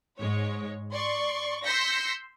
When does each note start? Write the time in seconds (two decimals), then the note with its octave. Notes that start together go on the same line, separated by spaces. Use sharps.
0.19 G#2 G#3 C#5
0.93 D5 C6 C#6
1.65 C6 E6 G6 A#6 B6 C#7